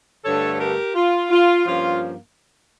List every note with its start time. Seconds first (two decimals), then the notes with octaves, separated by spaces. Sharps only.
0.24 G2 D3 A3 D4 A4 C#5
0.54 A4
0.59 G4 A#4
0.95 F4
1.31 F4
1.66 G2 F3 A#3 C#4 F4